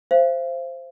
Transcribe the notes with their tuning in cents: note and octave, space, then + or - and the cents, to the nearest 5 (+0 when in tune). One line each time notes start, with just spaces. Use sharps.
C5 +0 F5 -40